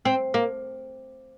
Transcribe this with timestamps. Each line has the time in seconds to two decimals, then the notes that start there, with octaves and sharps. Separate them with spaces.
0.05 C4
0.34 A#3